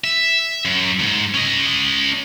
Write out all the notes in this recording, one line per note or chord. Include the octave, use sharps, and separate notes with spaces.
E5
F#2
E2 G#2
C#4 D#5